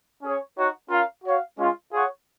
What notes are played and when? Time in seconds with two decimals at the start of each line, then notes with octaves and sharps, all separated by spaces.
0.22 C#4 G#4 C#5
0.57 D#4 F#4 C#5 F#5
0.90 C#4 F4 A#4 F5
1.24 F#4 C#5 F5
1.57 G#3 C#4 F4
1.91 F4 G#4 C#5 F#5